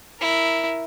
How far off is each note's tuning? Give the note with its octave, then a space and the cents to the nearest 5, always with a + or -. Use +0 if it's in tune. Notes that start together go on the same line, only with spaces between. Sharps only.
E4 +0 A#4 +0